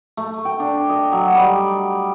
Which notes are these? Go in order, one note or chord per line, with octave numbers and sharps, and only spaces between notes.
A3
G5
D4
D#5
F#3
G3